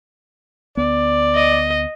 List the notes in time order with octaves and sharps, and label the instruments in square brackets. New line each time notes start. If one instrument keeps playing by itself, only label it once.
[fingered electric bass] D2 B3 [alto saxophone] D5
[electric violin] D#5